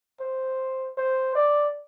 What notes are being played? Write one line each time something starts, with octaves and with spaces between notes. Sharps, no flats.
C5
C5
D5